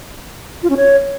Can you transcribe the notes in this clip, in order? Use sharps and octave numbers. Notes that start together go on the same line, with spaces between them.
F4
C#4
C#5